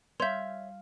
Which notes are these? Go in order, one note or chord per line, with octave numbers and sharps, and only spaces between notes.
G3 C#5 E5 F5 C6 G6